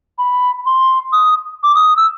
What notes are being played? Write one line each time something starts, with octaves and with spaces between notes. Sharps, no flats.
B5
C6
D#6
D6
D#6
E6